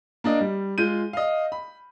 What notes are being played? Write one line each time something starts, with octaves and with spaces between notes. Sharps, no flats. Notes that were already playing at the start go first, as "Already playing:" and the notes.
A#3 D4 D#5
G3
G#3 F4 G6 D#7
D#5 F5
B5